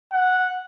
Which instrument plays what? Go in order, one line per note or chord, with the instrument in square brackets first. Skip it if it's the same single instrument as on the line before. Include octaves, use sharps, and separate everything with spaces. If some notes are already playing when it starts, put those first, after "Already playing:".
[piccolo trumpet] F#5